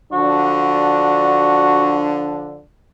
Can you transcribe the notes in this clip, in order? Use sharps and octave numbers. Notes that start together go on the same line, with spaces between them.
D3 F3 D4 F#4